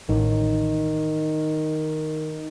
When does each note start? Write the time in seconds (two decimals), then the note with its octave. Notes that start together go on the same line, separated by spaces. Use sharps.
0.09 A1 D#3